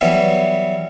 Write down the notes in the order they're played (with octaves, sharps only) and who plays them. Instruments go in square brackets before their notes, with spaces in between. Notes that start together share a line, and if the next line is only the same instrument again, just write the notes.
[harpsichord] E3 F#3 G3 B3 E4